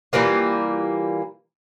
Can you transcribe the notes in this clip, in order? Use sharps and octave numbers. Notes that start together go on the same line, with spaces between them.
E3 G3 A#3 F4